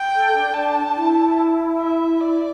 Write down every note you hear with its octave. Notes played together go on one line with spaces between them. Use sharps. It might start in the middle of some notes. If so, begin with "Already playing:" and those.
Already playing: G5
A4
D4
D4 A5
E4
E5
D5